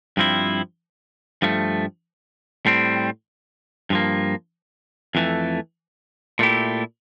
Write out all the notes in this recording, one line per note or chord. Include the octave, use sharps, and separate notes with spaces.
G2 F3 C4 E4
G2 F3 A3
A2 G3 C4
G2 F3 A#3
F2 E3 A3
A#2 A3 E4 G4